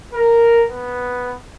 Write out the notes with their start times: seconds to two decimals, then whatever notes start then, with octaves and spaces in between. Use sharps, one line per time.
0.13 A#4
0.69 B3